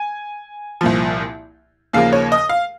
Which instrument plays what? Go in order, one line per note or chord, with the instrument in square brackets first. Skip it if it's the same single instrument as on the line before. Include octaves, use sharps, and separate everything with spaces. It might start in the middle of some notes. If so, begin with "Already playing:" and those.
Already playing: [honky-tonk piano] G#5
C2 A#2 F3
D#2 C#3 F3 A#3 F5
C#5
D#5
F5